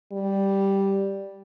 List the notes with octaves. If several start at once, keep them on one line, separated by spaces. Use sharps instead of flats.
G3